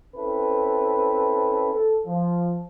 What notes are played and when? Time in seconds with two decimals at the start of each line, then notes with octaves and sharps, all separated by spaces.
0.17 C4 C#4 E4 A4 B4
1.74 A4
2.06 F3